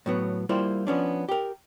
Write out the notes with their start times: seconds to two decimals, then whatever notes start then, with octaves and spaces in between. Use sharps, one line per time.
0.06 A2 F#3 B3
0.49 G3 A#3 E4 F4 C5
0.87 F3 B3 C#4 D4
1.29 G4 A#4